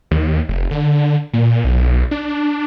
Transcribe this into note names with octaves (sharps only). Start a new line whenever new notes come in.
D#2
F1
D3
A#2
B1
D4